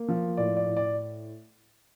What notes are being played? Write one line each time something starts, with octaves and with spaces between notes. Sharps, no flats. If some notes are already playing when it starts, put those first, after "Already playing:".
Already playing: A#3
F3
A2 D5
D5
A2
D5